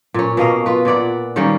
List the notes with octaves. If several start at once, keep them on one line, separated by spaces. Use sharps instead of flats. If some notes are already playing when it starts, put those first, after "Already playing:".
A#2 C#4
B2 A#3 D#5 F5
F4 B4
A#2 B4 D5 F#5
D#3 G3 A#3 C#4